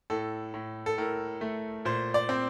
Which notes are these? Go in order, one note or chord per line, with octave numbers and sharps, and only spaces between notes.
A2 A4
A2
A4
A2 A#4
A3
A#2 C5
D5
C4